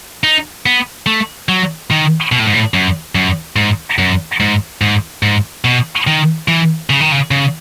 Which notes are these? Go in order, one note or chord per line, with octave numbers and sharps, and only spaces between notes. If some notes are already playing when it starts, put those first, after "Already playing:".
D#4
B3
A3
F#3
D#3
B2
A2
G#2
A2
F#2
F#2
G#2
F#2
G#2
G#2
G#2
B2
D#3
E3
C#3
D#3
C#3
C#3